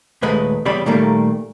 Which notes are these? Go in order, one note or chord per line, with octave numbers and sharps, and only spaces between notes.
D#2 A#2 G#3 A3 B4
E2 C#3 G3 G4 D5 B5
A#2 D#3 G3 A3 A#3